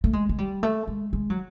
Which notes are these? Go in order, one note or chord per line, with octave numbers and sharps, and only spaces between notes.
A3
G#3
G#3
G3
A3
G#3
G#3
F#3